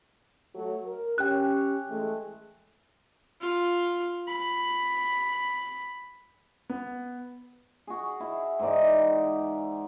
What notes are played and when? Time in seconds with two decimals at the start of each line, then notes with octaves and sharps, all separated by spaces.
0.54 F#3 A3
0.86 A#4
1.18 C#4 G4 G5 F#6
1.89 E3 G#3 A3
3.41 F4
4.27 B5
6.70 B3
7.87 F#4 G#4
8.20 E4
8.59 G#2 E3 D#4 D5